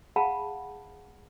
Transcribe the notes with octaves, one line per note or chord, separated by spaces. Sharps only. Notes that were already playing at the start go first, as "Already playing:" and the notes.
G#4 F5 F#5 A5 B5